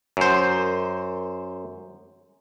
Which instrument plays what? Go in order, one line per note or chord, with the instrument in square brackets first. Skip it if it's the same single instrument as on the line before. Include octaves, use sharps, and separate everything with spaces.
[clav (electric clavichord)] F#2 C5